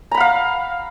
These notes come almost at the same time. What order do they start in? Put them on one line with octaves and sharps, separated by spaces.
A#5 B5 F#5 F5